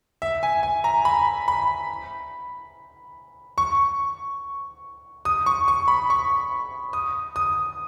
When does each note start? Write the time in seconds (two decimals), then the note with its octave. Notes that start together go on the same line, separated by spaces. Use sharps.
0.22 E5
0.43 G#5
0.63 G#5
0.84 A#5
1.05 B5
1.48 B5
3.58 C#6
5.25 D#6
5.46 C#6
5.68 C#6
5.88 B5
6.10 C#6
6.93 D#6
7.36 D#6